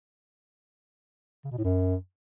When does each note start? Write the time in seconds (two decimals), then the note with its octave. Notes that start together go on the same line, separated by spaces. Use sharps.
1.44 C#3
1.51 B2
1.58 A2
1.64 F#2